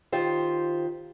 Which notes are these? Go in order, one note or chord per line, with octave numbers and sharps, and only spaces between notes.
D#3 F4 G4 C5